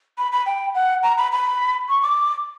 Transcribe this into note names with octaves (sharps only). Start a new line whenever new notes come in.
B5
B5
G5
F#5
A#5
B5
B5
C#6
D6